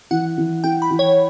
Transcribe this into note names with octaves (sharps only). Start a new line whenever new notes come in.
E3 F#5
E3
E4 G5
B5
E3
C#5